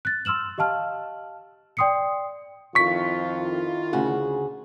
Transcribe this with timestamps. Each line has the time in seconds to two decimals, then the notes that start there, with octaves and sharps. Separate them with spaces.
0.05 F#6 A6
0.25 C6 E6 F6 E7 F#7
0.58 G4 D#5 F5 A5 F6
1.77 D5 G5 C6 D#6 C7 C#7
2.75 F2 D#3 E4 F4 C#6 B6
3.93 D2 C#3 F#4 G#4